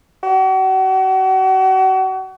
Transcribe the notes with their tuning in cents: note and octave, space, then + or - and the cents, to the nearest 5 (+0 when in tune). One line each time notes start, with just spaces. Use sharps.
F#4 +40